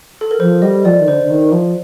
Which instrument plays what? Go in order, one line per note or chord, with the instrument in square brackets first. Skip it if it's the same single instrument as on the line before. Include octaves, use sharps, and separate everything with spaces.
[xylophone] A4
A#4
[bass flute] F3 [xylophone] C5
[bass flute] G3 [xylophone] D#5
[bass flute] F3 [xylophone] D5
[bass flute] D#3
[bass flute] D3 [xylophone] C5
[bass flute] D3
D#3
F3